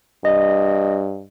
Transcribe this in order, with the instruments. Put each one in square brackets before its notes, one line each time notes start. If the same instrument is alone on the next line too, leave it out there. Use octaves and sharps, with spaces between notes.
[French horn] G2 [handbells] D#5